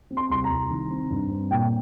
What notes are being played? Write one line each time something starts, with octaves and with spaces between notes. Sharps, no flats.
C4
C6
C2 C6
A#5
C2
D#3
C4
G2
C4
A#2 G5